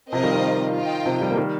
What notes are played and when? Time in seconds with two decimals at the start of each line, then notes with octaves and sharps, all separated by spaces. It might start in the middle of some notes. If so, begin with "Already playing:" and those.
0.12 C3 F3 C4 F4 A#4 D#5
0.23 D#3 G3
0.34 D#3
0.75 F4 D#5 G5
1.06 C3 F3
1.21 D#3 G3
1.30 A#3
1.37 D#3 G3